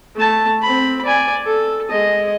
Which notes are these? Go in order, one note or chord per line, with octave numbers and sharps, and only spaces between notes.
A3 A5
C4 B5
D5 G#5
A4
G#3 D#5